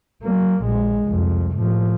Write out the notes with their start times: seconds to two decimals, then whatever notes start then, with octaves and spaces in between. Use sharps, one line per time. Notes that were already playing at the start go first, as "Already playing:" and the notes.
0.23 F#3 A#3
0.62 A#1 G#3
1.05 C2 F2
1.56 A2 F3